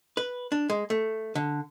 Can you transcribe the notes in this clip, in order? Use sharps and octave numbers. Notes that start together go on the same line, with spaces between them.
B4
D4
G#3
A3
D3